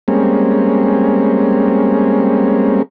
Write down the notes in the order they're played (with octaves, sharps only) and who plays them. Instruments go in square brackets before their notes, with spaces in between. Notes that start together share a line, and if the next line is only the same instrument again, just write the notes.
[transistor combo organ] G3 G#3 A#3 C4 C#4